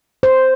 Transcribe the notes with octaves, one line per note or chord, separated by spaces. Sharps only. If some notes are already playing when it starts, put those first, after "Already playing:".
C5